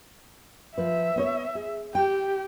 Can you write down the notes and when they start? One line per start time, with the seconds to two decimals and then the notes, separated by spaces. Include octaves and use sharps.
0.78 F3 B4 E5
1.16 B3 C5 C#5
1.55 G#4
1.95 G4 G5